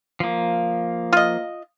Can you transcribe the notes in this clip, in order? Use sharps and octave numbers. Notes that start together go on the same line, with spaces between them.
F3 A#3
F4 D#5